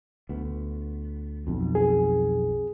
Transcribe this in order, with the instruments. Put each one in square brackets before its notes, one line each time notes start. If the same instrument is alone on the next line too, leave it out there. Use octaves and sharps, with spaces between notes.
[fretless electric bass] D2 B3
B1 F2
[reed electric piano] G#4